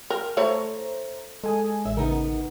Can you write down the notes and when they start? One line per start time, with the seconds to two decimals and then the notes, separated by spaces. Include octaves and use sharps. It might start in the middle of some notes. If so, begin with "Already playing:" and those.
0.10 A#4 G5 F6
0.37 A3 E4 C5 C#5 A#5
1.44 G#3 A4 G#5 D#6
1.85 A1 E5
1.97 C#3 B3 D#4 A#4